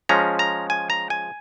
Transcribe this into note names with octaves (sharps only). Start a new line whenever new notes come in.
F3 G#3 C#4 A#5
A#5
G#5
A#5
G#5